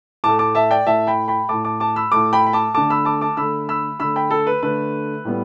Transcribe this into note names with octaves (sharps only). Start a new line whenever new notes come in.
A2 A3 A5 D6
A5 D6
E5 A5
D5 G5
A2 A3 E5 A5
G5 B5
G5 B5
A2 A3 A5 D6
A5 D6
A5 D6
B5 E6
A2 A3 A5 D6
G5 B5
B5
A5 D6
D3 A3 A5 D6
B5 E6
A5 D6
A5 D6
D3 A3 B5 E6
B5 E6
D3 A3 B5 E6
G5 B5
A4
B4
D3 A3 B4
A2 G3 B3